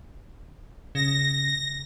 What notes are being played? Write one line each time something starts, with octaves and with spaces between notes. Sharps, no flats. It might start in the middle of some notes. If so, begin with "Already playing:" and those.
C#3 A#6